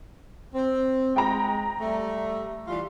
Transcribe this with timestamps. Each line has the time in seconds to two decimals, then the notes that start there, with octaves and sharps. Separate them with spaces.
0.55 C4
1.16 G#3 G5 A#5
1.80 G3 A3
2.68 E3 G3 F4